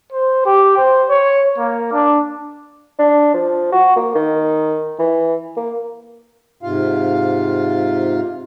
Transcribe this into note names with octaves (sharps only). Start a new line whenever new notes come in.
C5
G4
C5
C#5
A#3
D4
D4
F3
F#4
A#3
D#3
E3
A#3
G#2 C3 F4 F5